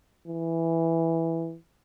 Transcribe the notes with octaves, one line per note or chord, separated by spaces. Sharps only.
E3